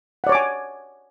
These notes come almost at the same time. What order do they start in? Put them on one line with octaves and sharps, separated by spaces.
F#5 D5 C#5 D6 G#5